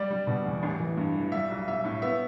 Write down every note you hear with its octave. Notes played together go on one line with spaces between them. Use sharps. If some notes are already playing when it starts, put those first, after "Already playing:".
Already playing: G3 D5
G3
B2
E2
A1
E3
G2
E3
G3 E5
B1
B1 E5
A2
B3 E5